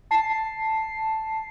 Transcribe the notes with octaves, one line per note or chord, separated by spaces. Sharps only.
A5 C7